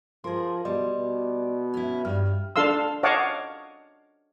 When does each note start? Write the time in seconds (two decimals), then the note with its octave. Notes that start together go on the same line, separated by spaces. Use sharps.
0.24 F3 G#4 A#4 C6
0.65 B2 G3 D5 D#5 C6
0.97 B2
1.74 C#4 E4
2.05 G2 G3 F6
2.56 D4 A4 F5 C6 E6
3.03 C#5 D#5 F5 F#5 A5 D6